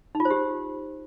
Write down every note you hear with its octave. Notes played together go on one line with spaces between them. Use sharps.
D#4
F4
C5
G4